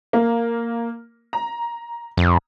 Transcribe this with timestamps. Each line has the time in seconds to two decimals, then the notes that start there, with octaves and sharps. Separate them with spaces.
0.13 A#3
1.33 A#5
2.17 F2